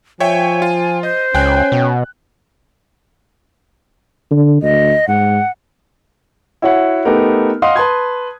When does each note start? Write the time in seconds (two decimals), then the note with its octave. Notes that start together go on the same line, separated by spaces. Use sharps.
0.20 F3 C#5 E5 G5 G#5
0.62 F4
1.03 C5 D#5
1.35 C#2 C#4 G5 G#5 F#6
1.72 B2
4.31 D3
4.62 D2 D#5
5.08 G#2 F#5
6.62 E4 F#4 C#5 E5 F#5
7.05 A3 B3 D#4 G4 A#4
7.62 D#5 F5 F#5 C6 D#6
7.76 B4 A5 C6 G#6